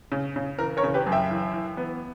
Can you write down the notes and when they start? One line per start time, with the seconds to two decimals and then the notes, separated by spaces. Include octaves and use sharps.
0.12 C#3
0.36 C#3
0.59 E3 A#4
0.77 A#4 C#5
0.83 C#3
0.94 G4 B4
1.07 F#2
1.12 E5 G5
1.31 E3
1.54 E3
1.77 B3